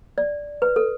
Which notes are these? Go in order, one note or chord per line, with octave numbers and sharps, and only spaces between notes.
D5
B4
A4